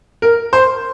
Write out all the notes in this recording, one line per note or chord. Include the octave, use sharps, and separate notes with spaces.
A#4
C5